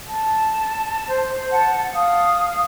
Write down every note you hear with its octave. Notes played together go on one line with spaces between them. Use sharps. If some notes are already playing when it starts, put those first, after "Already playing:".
A5
C5
F#5 A5
F5 D#6